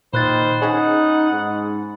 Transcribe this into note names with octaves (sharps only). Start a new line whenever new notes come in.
A#2 D#3 C5 B5 F#6 A6
C#4 D#4 G#4 F#5
G#2